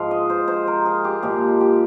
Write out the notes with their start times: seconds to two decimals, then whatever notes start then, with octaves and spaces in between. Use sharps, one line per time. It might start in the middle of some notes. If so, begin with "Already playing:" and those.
Already playing: G#2 F3 G#3 F5
0.11 D#5
0.30 C5
0.48 C5
0.67 A#4
0.86 G#4
1.05 G4
1.22 A#2 F3 G#3 G4
1.61 G4